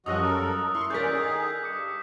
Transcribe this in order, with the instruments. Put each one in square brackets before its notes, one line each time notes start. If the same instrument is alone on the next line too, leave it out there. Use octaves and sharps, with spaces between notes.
[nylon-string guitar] F#2 G3 [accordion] F3 F#4 D#5 [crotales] D#6 E6 F#6
[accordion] A4 A#4
[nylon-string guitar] E4 [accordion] C6 C#6
[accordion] D#2 C#4 D5 [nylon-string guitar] A4 A#4 [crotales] G6 B6
[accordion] D#3 G#4
[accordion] G2 [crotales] D6 C#7